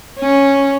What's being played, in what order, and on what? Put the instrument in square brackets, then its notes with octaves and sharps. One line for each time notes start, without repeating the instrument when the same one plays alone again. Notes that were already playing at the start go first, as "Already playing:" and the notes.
[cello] C#4